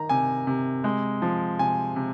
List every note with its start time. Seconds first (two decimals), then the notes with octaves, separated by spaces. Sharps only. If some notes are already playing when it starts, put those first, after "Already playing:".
Already playing: D#3 A#5
0.09 C3 G#5
0.47 C3
0.84 G#3
1.22 F3
1.59 C3 G#5
1.96 C3